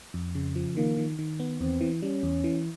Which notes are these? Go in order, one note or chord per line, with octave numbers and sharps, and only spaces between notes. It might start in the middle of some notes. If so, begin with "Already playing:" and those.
F2
C#3
F3
D#3 A#3
D#3
D#3
B3
E2 C4
E3
G3 C#4
E2
E3